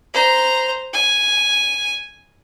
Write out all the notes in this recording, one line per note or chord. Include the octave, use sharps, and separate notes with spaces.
C5 A#5
G#5